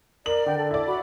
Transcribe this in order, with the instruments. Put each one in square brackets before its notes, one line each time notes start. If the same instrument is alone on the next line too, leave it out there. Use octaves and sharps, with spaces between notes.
[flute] A#4 [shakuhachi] D5 [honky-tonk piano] F#7
[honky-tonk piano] D3 [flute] G5
[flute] A4
[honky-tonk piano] E4 D5
[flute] F#4 [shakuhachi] B5